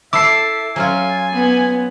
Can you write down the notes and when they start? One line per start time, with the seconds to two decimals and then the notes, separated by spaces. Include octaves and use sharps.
0.13 E4 A4 E5 D6 C7
0.76 F#3 C#4 F4 G#5
1.33 B3